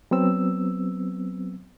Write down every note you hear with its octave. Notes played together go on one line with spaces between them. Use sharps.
F#3 B3 C4 E6